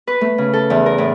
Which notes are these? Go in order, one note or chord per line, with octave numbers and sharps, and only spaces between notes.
B4
A3
C#3
A4
E2
A#4
A2